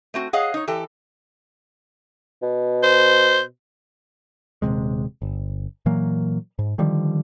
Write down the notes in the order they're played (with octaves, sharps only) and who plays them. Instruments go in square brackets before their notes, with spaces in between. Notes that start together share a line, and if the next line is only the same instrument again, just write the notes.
[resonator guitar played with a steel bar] A3 C4 F#4
G#4 C#5 D#5 F5 F#5
D#4 C#5
E3 G4 A4
[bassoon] B2
[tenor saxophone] C5
[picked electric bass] D#1 B1 C3 G#3
G1
A#2 E3 F#3 A#3
G#2
D3 D#3 F3 G3